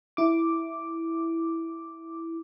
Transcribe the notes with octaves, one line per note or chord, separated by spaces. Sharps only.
E4 D6